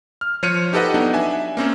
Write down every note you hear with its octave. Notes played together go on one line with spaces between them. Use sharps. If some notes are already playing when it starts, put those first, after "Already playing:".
F6
F3 C5 C#5 F6 C#7 D#7
D#4 G4 A4 B4 D#5 F#5
F#3 B3 D4 D#4
D4 E5 G#5
A#3 C4 C#4